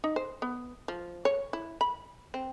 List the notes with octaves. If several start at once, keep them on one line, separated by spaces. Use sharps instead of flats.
D#4
C5
B3
F3
C#5
E4
B5
C4